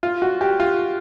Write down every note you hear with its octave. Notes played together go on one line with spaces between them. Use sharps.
F4
F#4
G4
F4